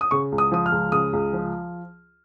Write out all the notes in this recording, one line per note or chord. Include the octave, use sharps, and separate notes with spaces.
D#6
C#3 C#6
C#2
D#6
F3 D#6
F6
C#2
C#3 D#6
C#2
F3